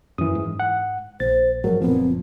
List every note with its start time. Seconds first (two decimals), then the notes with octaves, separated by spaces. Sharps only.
0.18 F#2 E3 D#6
0.35 G#2
0.60 F#5
1.20 A#1 C5 A6
1.64 G#2 F3 F#3 A#4
1.82 F#1 A#2 F3 B3 C4